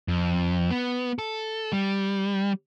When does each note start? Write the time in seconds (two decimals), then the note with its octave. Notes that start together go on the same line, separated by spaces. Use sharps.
0.08 F2
0.71 B3
1.18 A4
1.73 G3